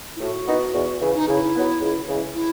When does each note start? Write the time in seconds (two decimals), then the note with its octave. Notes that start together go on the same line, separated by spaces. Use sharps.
0.16 E4
0.21 A2 F#4
0.47 E3 B3 D#4
0.74 E2
1.01 C#3 E3
1.15 D#4
1.28 C#3 E4
1.55 F#3 B3
1.81 C#2
2.08 C#3 E3 G#3
2.34 E4